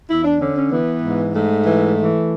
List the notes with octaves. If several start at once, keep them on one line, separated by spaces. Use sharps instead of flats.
E2 E4
D4
D3 C#4
C#4
E3 B3
G#2
G#2 A3
E3
E3